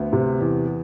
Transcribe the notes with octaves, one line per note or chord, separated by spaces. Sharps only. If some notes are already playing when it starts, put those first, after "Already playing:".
Already playing: D2 B3
C3
E2